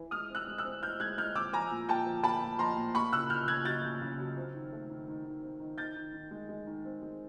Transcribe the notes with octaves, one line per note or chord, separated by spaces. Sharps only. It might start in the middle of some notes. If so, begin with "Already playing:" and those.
Already playing: E3
G#3 D#6 F6
C4
E6 F#6
G#3
E6 F#6
C4
E3 F6 G6
G#3 F#6 G#6
G#3 F6 G6
C4 D6 E6
F3 G#5 A#5
A#2
A#2 G5 A5
F3
A#3 A5 B5
A#2
F3 A#5 C6
A#2
A#3 B5 C#6
C#3 E6 F#6
C#3 F6 G6
C#3 F#6 G#6
F#3 G6 A6
C#3
C#3
F#3
C4
D#3
A3
D#3
D#3
D#3
C4
D#3
D#3 G6 A6
D#3
D#3
G#3
G#3
D#3
C4
G#3